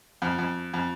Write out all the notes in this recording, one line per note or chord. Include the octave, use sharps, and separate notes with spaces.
F2
F2
F2